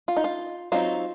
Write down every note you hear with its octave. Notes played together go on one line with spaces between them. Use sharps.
F4
D#4
F4
F#3 C4 D#4 F4